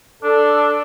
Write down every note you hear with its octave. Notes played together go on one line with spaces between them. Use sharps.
D4 A4